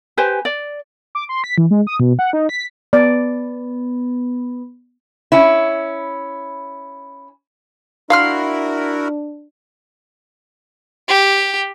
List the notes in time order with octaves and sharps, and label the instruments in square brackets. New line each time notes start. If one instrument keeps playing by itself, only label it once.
[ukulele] G4 B4 C5 G#5
D5
[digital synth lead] D6
C6
B6
E3
G#3
D#6
B2
F#5
D#4
B6
[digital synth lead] B3 [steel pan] D5
[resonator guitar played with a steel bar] C#4 E4
[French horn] D4 [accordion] E4 F#4 A#4 [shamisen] F5 [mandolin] B5 C6 F6
[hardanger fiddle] G4